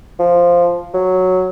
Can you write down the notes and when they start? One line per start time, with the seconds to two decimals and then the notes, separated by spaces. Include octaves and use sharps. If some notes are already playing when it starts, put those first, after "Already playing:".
0.19 F3
0.94 F#3